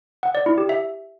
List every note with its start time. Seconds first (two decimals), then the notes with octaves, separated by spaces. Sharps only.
0.23 F#5
0.35 D5
0.46 E4
0.58 G4
0.69 E5